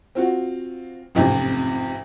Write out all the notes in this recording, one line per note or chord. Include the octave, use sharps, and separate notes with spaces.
C4 F4 F#4
A1 F2 G#2 C3 F3